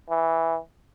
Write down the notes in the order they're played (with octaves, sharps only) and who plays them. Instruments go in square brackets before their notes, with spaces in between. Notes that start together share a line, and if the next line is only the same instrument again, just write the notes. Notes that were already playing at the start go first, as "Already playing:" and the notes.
[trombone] E3